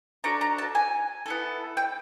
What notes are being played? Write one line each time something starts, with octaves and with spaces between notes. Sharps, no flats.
D4 F#4 A4 A#5
A#5
A5
G#5
B3 E4 A4
G5